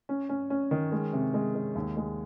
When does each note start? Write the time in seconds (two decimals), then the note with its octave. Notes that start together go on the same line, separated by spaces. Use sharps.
0.09 C#4
0.29 C#4
0.50 C#4
0.71 D#3
0.92 G#3
1.13 C3
1.34 G#3
1.55 G#3
1.75 D#2
1.97 G#3